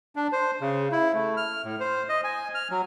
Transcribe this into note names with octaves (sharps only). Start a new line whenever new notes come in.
D4
C5
C#3
E4
A3
F6
A2
C5
D#5
G#5
F6
F#3